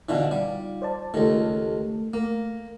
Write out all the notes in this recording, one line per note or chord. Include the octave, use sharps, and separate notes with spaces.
B2 D3 E3 D#4 F4 F5
G3
C5 D5 A5
C#2 D#3 A3 G4 A4
A3 A#3